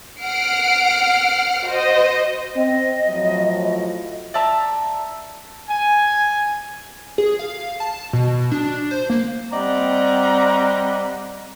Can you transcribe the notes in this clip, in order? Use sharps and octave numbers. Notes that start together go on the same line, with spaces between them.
F#5 F6 C7 D7
F#4 C5 D#5
C4 D#5
A2 F3 F#3
D5 E5 A5 A#5
G#5
G#4
F5
A5
B2
D4
C5
A#3
G3 C4 D5 D#5 F#5 A#5